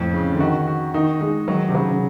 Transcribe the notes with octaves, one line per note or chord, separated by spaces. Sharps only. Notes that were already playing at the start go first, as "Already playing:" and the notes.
Already playing: F2 A2
C#3
D3
D#3 F#4
F#4
D#3 D#4
G#3 D#4
D#3 F#3
C3
C#3 F#3
C#3